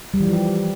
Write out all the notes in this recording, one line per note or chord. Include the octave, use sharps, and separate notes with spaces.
G3
E3
F3
G4